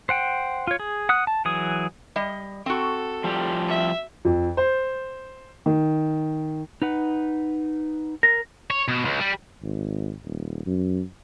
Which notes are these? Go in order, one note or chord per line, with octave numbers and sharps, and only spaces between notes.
C5 F#5 G5
F4 C#5
G#4
F#5 D#6 F#6
A5
E3 F#3 G#4 D#6
G3 D#5
C4 F#4 A4
F3 G3 G4
E5
F2
C5
D#3
D#4 B4 F#5
A#4 A#6
C#5
B2
C#2
G3
G#1
D#1
F#2